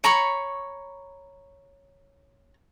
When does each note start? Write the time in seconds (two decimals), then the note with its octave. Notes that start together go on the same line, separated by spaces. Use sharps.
0.04 C#5 A#5 B5 C#6